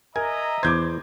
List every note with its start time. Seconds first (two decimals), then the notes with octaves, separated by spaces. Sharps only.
0.16 A#4 D#5 E5 G#5 A#5
0.63 E2 C5 D6 G6 G#6